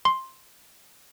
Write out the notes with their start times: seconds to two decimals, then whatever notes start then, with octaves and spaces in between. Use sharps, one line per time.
0.05 C6